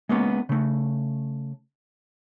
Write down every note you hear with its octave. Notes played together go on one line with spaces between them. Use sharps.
G#3 A#3 B3 C#4
C#3 A3